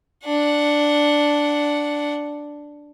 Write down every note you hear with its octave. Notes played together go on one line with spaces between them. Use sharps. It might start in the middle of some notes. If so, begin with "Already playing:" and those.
D4 F#5